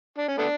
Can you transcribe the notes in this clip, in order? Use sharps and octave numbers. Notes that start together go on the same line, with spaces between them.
D4
C#4
A3 B3 D4